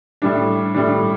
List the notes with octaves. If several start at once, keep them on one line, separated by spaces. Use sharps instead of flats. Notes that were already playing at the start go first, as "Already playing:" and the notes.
A2 G3 D4
A2 G3 D4